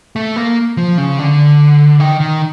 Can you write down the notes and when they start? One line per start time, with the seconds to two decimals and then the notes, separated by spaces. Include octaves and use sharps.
0.16 A3
0.36 A#3
0.77 F3
0.98 C#3
1.19 D3
2.00 D#3
2.20 D#3